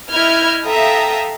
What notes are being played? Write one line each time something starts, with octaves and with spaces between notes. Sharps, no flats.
E4 D#5 F6 G6 G#6
A4 E5 F5 G5 A#5 D#6